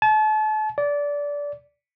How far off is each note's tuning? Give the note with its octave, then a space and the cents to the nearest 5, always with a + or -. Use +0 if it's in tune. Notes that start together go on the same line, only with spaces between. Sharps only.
A5 -35
D5 -20